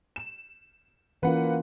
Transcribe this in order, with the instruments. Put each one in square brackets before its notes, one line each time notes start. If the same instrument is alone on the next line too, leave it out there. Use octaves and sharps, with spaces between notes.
[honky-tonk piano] E7
[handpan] E3 C#4 F4 [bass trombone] A#3 [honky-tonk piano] B4 F#5